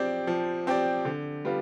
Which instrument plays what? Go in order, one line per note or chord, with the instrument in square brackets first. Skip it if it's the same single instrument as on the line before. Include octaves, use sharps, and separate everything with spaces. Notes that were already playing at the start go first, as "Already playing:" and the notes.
Already playing: [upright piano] F3 C4 G4 D5
F3
C4 G4 D5
D3
G3 B3 F4